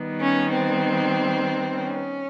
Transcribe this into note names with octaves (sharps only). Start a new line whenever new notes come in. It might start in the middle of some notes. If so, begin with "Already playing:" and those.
Already playing: D#3 G3 B3
C#4
C4
C#4